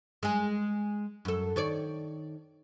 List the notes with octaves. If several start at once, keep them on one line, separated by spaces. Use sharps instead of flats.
G#3 G#4
F#2 A4
D#3 C#5 D5